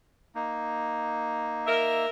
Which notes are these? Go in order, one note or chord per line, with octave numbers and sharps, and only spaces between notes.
A#3 D#4
A#4 E5